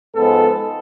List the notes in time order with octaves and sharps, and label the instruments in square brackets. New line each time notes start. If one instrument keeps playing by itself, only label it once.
[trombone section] G#2 F3 G#3 B3 A4